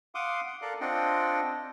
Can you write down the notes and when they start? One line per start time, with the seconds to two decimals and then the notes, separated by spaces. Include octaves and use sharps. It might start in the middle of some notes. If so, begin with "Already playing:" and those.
0.15 F5 F#5 C6 D6 D#6
0.47 F#5
0.62 A4 A#4 D5 F5 F#6
0.81 C4 D4 F4 D#5 F#5 G5